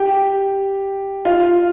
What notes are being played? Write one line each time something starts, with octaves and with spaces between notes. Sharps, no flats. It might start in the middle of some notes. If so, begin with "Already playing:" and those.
Already playing: G4 G5
F4 F5